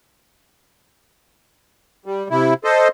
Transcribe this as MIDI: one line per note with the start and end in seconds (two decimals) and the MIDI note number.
2.06 2.28 55
2.31 2.54 48
2.31 2.54 64
2.64 2.88 69
2.64 2.88 72
2.64 2.88 75